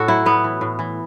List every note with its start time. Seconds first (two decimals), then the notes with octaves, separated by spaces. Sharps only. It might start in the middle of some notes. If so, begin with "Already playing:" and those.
Already playing: A2 F#4 A4
0.08 F#3 E4
0.26 A2 B3
0.44 E3
0.61 A2
0.79 E3